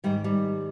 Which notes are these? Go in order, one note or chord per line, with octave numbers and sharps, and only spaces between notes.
G#2 D#3 G3
G3